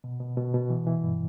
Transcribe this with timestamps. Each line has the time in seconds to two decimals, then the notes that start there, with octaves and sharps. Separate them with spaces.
0.04 B2
0.20 B2
0.37 B2
0.54 B2
0.70 E3
0.87 E3
1.03 G2